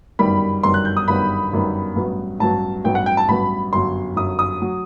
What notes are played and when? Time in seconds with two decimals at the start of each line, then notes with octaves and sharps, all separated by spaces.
0.19 G1 F#2 D#3 G3 B3 B5
0.63 G1 F#2 D#3 G3 B3 C6
0.74 F#6
0.85 G6
0.97 D#6
1.08 G1 F#2 D#3 G3 B3 B5
1.52 G1 F#2 D#3 G3 B3
1.96 A1 G2 F#3 B3
2.39 A1 G2 F#3 B3 A5
2.84 A1 G2 F#3 B3 G5
2.95 F#5
3.06 G5
3.17 A5
3.28 A1 G2 F#3 B3 B5
3.73 G1 F#2 F#3 C6
4.16 G1 F#2 F#3 D#6
4.39 D#6
4.62 F#3